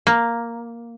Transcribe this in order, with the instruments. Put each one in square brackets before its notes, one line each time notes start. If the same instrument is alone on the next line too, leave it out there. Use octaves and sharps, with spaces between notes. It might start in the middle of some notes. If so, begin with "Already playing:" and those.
[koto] A#3